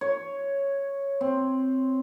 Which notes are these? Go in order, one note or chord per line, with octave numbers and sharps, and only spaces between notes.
C#5
C4